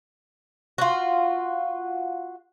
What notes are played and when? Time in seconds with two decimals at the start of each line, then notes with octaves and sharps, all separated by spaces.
0.78 F4 F#4